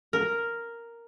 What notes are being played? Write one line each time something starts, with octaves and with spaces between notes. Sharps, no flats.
A#4